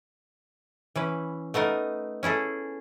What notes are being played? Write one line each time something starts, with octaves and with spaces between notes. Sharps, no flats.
E3 C#4 B4
A3 B3 D#4 A#4
C#4 E4 G#4 A4